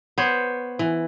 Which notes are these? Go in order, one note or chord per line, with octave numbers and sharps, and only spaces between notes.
B3 C5 C#5
E3